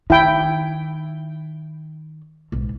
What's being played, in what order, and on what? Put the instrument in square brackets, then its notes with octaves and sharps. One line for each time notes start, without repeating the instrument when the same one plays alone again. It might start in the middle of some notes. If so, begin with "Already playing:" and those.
[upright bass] D#3 [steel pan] E4 G5
[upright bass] B1 G#2